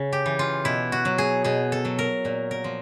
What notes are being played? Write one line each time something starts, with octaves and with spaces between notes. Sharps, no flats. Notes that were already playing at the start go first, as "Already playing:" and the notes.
Already playing: C#3
G4
E3
F4
B2 E4
F#4
F#3
G#4
B2 G#4
A4
F#3
A#4
A#2
A#4
F3